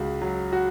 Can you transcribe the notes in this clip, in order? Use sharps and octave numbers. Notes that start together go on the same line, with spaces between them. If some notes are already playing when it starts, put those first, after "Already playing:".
Already playing: C#2 F#4
F#3
F#4